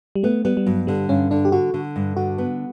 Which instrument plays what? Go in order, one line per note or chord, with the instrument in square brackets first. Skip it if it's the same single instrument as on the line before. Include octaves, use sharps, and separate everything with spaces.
[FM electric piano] G3
[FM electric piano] A3 [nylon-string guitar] B3
[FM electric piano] G3 [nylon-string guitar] B3
[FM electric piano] G3
[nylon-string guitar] G2 [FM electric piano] F#3
[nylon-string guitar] D3 [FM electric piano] G3
[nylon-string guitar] G2 [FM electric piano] C#4
[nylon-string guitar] D3 [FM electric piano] D4
[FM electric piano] G4
[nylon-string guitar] D3 [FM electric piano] F#4
[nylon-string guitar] D3
G2
[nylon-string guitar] D3 [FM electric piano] F#4
[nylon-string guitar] B3